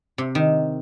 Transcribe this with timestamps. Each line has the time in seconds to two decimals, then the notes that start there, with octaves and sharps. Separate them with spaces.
0.18 C3
0.35 D#3